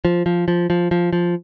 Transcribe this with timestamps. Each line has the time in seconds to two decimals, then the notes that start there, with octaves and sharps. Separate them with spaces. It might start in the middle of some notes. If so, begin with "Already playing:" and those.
0.05 F3
0.26 F3
0.48 F3
0.70 F3
0.91 F3
1.13 F3